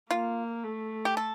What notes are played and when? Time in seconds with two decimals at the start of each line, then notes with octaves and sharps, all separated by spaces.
0.11 A#3 F4
0.64 A3
1.05 G4
1.17 A4